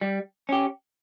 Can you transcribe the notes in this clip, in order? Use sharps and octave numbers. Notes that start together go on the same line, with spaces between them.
G3
C#4 G4